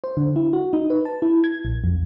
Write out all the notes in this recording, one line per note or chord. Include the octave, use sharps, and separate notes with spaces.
C5
D3
E4
F#4
D#4
B4
A5
E4
G#6
A#1
F2